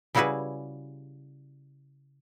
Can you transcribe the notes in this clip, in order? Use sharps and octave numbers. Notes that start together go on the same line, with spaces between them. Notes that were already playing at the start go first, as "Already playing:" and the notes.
C#3 G3 E4 F#4 G#4 B4